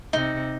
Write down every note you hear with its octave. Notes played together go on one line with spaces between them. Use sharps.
C3 D#4